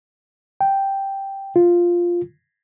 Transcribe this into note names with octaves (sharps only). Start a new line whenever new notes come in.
G5
F4